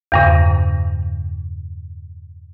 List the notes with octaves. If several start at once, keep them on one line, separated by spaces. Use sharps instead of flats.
E2 G2 C#3